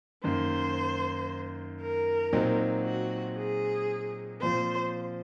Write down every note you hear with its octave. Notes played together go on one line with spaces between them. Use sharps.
F#2 D#3 A#3 C5
A#4
A#2 F#3 C4 D#4
F#4
G#4
A#2 F3 C4 F4 C5